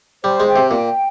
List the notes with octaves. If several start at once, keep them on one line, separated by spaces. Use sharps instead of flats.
G3 C5
G#3
G5
C3
A#2 G5